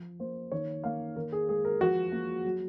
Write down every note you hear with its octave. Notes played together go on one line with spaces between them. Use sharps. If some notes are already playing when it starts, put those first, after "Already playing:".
Already playing: F3
A#3 C5
D#3 C#5
A#3 F5
D#3 A#4
G#4
G#3 G#4
A#4
F3 F#4
A#3
F#3